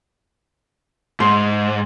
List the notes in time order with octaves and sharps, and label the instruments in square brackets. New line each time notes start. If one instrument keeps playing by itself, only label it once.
[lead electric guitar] G#2 [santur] C6